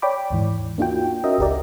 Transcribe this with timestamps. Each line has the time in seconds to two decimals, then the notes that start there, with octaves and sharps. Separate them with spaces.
0.02 C#5 D5 G5 B5 D6
0.31 D#2 G#2 E3
0.78 A#3 D4 D#4 F4 F#4 G5
1.24 C#4 F#4 A#4 D#5 E5 G5
1.38 G1 C#2 G4 A#4 D5